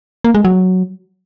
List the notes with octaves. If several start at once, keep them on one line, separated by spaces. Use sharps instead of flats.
A#3
G#3
F#3